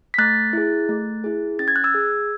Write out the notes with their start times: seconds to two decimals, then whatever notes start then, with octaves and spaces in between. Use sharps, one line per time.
0.14 B6
0.18 A3 F#6 A6
0.53 E4 G#4
0.89 A3
1.24 E4 G#4
1.59 C#4 A6
1.68 G#6
1.76 F#6
1.84 E6 G#6
1.94 G#4